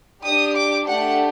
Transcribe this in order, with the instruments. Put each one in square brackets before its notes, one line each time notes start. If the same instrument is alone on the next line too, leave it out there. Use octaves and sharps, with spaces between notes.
[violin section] D4 G4 D#6
D6
A3 D4 G4 F#5